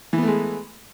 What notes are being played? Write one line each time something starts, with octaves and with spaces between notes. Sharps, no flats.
E3 G#3 A3 B3